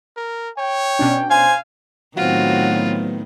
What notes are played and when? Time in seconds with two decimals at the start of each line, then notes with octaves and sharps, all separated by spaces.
0.17 A#4
0.58 C#5 G5
0.99 B2 C#4 D4
1.30 C5 F5 G#5
2.17 A2 D#3 F#3 B3 C4 F4 F#4